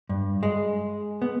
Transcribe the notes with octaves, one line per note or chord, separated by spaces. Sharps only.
G2
G#3
B3